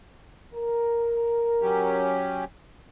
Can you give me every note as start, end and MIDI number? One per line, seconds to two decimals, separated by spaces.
0.54 2.13 70
1.62 2.44 54
1.62 2.44 61
1.62 2.44 67